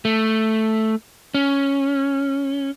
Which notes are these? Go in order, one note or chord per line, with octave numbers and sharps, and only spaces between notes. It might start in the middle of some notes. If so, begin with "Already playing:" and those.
A3
C#4